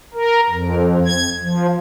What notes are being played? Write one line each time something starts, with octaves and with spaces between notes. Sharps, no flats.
A#4
F2
G#6
F3